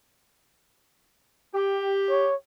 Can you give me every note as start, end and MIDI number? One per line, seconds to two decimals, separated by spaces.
1.54 2.25 67
2.10 2.35 73